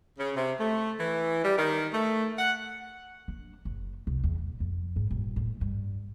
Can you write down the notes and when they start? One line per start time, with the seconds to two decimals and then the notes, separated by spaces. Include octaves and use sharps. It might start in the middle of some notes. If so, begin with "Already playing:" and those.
0.18 C#3
0.36 C3
0.60 A3
1.00 E3
1.44 G3
1.58 D#3
1.94 A3
2.38 F#5
3.28 D4
3.65 F#1
4.07 C2
4.24 E2
4.38 A#1
4.60 F2
4.96 G#2
5.11 D#1
5.36 A2
5.61 G2